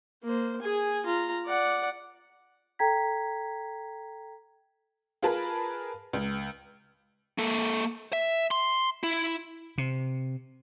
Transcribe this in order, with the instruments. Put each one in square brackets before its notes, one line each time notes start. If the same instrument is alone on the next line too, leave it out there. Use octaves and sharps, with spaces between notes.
[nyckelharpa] A#3 C5
G#4 G#5
F4 A#5
D5 F#5
[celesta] A4 G5 A#5 G#6 B6
[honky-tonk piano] F4 G#4 A#4 B4 A5 B5
C#2
[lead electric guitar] A#3 A4
E5
C6
E4
[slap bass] C3